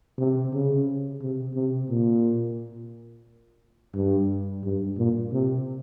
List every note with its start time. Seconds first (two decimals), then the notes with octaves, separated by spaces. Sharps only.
0.18 C3
0.53 C#3
1.21 C3
1.55 C3
1.90 A#2
3.95 G2
4.64 G2
4.98 A#2
5.33 C3